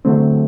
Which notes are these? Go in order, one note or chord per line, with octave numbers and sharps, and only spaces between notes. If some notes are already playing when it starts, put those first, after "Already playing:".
D3 F#3 A3 C4